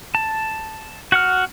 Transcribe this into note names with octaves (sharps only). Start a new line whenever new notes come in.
A5
F#4 F#5 F6